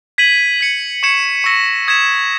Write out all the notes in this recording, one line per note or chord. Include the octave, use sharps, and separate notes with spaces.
G#6 B6 D#7 F#7
G#6 C#7 F#7
C#6 G#6 C#7 E7
C#6 E6 A#6 C#7
D#6 G#6 B6 E7